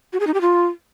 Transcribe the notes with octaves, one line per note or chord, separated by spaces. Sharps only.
F#4
G#4
D#4
G4
F4